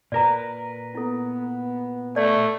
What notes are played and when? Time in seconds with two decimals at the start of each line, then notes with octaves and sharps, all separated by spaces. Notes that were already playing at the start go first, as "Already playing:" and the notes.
0.12 A#2 A#4 B4 D5 A#5
0.95 B3 E4 A4
2.16 A3 D5